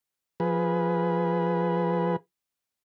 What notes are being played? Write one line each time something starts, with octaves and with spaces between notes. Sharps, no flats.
F3 G#4 B4